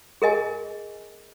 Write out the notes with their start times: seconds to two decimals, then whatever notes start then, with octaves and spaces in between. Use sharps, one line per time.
0.22 G#4 A#4 D#5 G#5